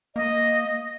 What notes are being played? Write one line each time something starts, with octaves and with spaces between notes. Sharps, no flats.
A#3 D#5